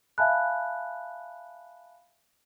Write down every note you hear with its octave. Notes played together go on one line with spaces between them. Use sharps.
E5 F5 G#5 A5 B5 F#6